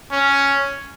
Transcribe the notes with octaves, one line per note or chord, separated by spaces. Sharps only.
C#4